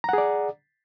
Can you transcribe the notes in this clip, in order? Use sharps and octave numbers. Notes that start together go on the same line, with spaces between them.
G#4 D5 F#5 A#5